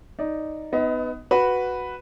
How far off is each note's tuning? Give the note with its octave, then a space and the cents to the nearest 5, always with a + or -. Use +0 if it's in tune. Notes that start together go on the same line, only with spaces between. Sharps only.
D#4 +0 D5 -5
B3 +20 D#4 +0 D#5 +30
F#4 +0 B4 +0